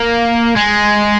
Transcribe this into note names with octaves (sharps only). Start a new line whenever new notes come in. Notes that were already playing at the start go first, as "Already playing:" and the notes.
Already playing: A#3
G#3